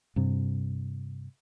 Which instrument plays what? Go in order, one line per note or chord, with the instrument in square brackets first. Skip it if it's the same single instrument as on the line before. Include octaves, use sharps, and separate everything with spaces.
[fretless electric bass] G2 C3